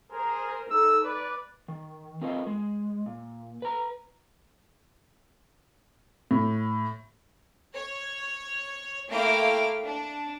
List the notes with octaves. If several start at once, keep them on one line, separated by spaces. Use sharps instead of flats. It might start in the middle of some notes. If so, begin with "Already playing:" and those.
G#4 A#4 C5
D#4 A4 E6
B4 D5
D#3
C4 F4 A#4 B4 D#5
G#3
A#2
B4 A#5
A2
C#5
A3 A#3 E4 F5 G5 D6
D4